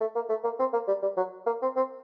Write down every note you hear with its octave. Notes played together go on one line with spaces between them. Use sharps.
A3
A#3
A3
A#3
C4
A#3
G3
G3
F#3
A#3
C4
C4